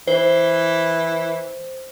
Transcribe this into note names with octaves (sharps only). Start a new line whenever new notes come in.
E3 C5